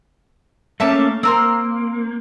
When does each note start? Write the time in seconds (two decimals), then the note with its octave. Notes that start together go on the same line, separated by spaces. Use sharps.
0.80 A3 A#3 C#4 E5 A5 D6
1.23 A#3 C4 A#4 C6